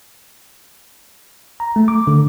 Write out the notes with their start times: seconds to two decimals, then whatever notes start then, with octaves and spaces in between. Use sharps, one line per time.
1.60 A#5
1.76 A3
1.88 D6
2.07 D3